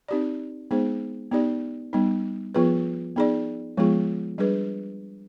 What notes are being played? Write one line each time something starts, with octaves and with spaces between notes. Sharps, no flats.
C4 D#4 G4 D5
G#3 B3 D#4 G#4 C5
B3 D#4 G4 D5
G3 B3 D#4
F3 B3 F4 G#4 B4
B3 D#4 G#4 D5
F3 G#3 B3 F4 G#4
G3 D4 G#4 B4